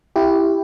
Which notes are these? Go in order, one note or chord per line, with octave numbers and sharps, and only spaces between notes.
E4 G4